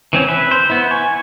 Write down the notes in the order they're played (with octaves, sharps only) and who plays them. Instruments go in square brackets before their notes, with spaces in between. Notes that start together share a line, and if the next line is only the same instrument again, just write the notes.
[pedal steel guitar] E3 C4 C#4
B4 E5
C5
B3 E4
G#5 C#6